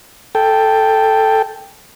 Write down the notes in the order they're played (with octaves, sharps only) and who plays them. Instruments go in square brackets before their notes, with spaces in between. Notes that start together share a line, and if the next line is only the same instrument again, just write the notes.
[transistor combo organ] A4 G5